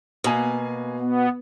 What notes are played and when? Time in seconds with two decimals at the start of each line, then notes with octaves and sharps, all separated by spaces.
0.24 B2 A#3 G#5
1.00 B3